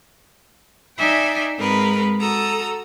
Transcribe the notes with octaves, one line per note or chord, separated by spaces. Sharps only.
D#4 D5 E5 G5 G#5 C6
G#2 G#3 C4 A#4 B4 B5
F#4 A4 A#5 D#6 E6